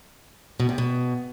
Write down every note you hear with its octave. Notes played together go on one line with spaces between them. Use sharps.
B2
C3
B2